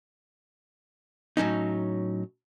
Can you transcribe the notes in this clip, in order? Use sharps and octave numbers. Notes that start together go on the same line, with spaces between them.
A2 F#3 C#4 D#4